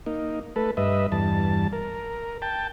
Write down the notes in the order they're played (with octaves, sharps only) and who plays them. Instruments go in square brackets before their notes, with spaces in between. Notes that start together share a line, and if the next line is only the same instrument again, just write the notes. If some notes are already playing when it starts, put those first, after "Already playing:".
[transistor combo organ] A#3 D#4
A3 A4 B4
G2 B4 D#5 E5
E2 G2 A5
A#4
G5 A5